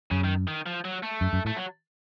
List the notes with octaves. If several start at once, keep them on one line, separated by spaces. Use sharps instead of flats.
F#2 C#3
D#3
D#3
F3
F#3
A3
F#2
F#2
A2 A3
F#3